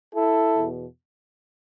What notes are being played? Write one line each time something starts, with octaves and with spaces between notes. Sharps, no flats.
E4 A4
E2 B2